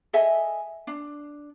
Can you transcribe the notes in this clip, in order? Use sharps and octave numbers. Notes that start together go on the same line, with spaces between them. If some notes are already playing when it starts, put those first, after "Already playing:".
A4 D#5 E5 G#5
D4